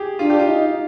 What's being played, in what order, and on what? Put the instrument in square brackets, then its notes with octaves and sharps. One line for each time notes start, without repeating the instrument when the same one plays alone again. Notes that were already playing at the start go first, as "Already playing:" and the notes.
Already playing: [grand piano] G4 G#4
[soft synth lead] D4 [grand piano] F4
[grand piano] G4
F4
[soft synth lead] D#4